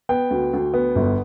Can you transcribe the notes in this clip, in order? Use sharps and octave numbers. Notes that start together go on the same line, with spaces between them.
B3 G5
D2
D2
B3
G1